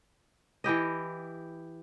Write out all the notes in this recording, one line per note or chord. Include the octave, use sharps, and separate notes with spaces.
E3 E4 G4 D#5